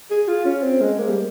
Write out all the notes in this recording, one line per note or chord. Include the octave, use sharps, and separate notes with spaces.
G#4
F4
C#4
C4
G#3
A#3
G3